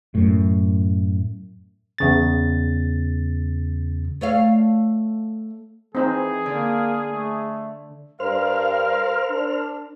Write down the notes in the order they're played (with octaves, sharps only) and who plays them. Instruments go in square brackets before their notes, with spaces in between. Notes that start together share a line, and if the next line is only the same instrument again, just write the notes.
[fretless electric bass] F#2 A2
[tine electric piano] E2 C#3 A6
[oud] A3 C#5 F5
[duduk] E3 [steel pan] C4 D#4 C5 [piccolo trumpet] G#4
[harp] D3 [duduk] A#3
[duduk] A3
[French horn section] G2 [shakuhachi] A#4 [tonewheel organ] C5 F6 [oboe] F5
[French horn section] D4